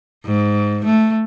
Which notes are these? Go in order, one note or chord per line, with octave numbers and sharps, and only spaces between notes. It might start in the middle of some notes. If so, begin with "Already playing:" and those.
G#2
A3